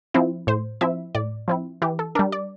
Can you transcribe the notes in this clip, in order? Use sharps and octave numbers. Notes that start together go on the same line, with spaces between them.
F3 C4 E4
A2 C5
F3 C4 E4 E5
A2 D5
F3 C4 E4
E3 G4
A4
G3 D4 A#4
D5